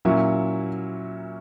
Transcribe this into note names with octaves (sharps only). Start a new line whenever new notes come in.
A#2 F#3 A#3 C#4 E4